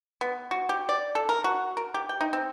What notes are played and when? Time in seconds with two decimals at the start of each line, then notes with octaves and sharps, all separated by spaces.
0.21 B3
0.51 F#4
0.69 G4
0.89 D5
1.15 A4
1.29 A#4
1.44 F#4
1.77 A#4
1.94 G4
2.09 G5
2.21 D#4
2.33 C4